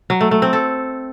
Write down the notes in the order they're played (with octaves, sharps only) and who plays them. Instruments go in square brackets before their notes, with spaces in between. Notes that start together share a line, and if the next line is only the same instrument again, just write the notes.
[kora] F#3
A3
A3
C4
A4